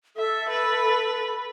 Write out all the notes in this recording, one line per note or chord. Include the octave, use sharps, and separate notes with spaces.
A4 E5
B4 B5